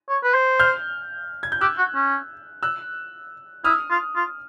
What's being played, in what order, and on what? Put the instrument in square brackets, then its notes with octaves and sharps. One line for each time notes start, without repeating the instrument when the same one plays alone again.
[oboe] C#5
B4
C5
[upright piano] F6 G6
G#6
G6
[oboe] G4 [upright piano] E6 F#6
[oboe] F#4
C#4
[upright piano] E6 F#6
[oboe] E4 [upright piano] D#6 F6
[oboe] F4
F4